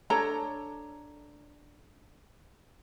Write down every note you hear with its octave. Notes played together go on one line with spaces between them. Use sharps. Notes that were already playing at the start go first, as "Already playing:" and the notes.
D4 A4 C#5 A#5